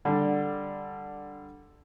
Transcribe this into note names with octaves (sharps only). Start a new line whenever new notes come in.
D3 G3